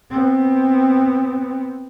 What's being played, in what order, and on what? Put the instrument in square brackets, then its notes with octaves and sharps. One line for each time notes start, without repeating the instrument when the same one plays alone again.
[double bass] B3 C4